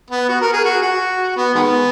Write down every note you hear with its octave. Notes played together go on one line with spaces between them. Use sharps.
B3
F#4
A#4
G#4
F#4
F#4
B3
D#3 G#3 B3